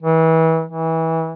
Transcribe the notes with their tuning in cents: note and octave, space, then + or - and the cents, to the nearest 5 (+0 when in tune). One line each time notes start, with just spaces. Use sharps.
E3 -30
E3 -25